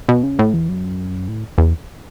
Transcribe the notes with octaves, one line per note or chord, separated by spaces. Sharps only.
B2
C#3
A2
E2
F#2
A2
E2